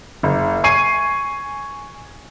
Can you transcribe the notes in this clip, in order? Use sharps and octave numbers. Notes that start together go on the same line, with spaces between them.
F#1
G#5 C#6 G#6 C7 D#7